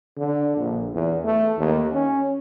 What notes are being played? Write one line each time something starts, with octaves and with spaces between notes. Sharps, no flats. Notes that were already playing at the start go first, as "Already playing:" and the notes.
D3
A#1
E2
A3
D#2
C#4